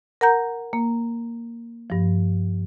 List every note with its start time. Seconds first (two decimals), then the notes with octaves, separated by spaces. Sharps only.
0.21 A#4 F#5 A#5 G6
0.73 A#3
1.90 G2 F3